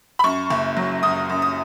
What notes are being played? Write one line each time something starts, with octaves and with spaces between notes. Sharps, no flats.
B5
F#2 C#6
F#1
F#3
F#2 D#6
F#2
D#6